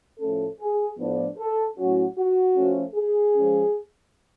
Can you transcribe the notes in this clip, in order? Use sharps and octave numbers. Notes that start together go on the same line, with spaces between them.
A2 F3 A3 C#4 A4
G#4
A2 F3 B3 D4
A4
A2 F#3 C#4 F#4
F#4
F3 A3 C#4
G#4
F3 G#3 C#4